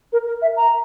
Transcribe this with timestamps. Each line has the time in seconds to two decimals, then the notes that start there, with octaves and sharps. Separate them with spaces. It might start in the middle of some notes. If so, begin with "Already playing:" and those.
0.13 A#4
0.27 A#4
0.42 E5
0.57 A#5